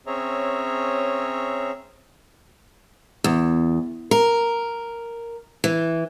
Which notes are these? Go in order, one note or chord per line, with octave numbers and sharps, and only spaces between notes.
C4 C#4 G#4 C#5 E5 A#5
E2
A#4
E3